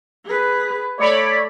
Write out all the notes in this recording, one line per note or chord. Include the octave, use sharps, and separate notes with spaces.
G#4 B4
A3 C#5 D5 B5